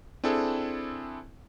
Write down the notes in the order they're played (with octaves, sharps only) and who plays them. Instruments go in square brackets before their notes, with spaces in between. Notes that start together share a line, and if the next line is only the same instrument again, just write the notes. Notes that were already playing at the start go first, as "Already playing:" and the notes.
[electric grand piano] C4 D4 E4 G#4 A4